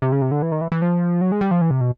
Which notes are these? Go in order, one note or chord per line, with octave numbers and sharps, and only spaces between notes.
C3
C#3
C3
D3
E3
D#3
E3
E3
F3
F#3
G#3
G3
F3
E3
C3
B2